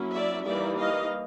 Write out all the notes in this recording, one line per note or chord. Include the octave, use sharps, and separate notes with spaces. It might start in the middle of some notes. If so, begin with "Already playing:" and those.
Already playing: F#3 A#3 C#4 E4
D5 E5
E3 G3 A#3 D#4 D5 E5
D#5 F5